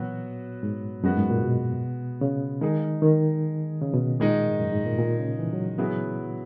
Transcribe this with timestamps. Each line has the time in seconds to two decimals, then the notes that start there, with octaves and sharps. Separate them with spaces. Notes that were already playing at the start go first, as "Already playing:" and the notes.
Already playing: A#2 E3 F#3 B3 F#4
0.63 G#2
1.04 F#2 G#3 B3 F#4
1.17 G#2
1.29 A#2
1.43 B2
2.21 C#3
2.61 D#3 G#3 D#4 G#4
3.02 D#3
3.81 C#3
3.94 B2
4.20 A#2 D#3 G#3 D#4
4.49 G#2
4.60 F#2
4.73 G#2
4.86 A#2
4.99 A#2
5.19 C#3
5.39 E3
5.53 F#3
5.78 F#3 B3 E4 G#4